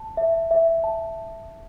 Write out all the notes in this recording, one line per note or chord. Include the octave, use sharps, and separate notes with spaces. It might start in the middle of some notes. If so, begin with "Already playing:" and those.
Already playing: A5
E5
E5
A5